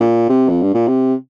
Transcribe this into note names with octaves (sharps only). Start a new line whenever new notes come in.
A#2
C3
F2
G2
A#2
C3